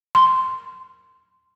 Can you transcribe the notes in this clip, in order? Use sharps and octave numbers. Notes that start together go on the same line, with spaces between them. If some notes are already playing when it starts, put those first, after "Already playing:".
C6